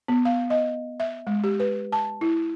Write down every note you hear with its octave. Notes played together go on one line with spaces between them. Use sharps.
B3
F5
D#5
E5
G#3
G4
B4
A5
E4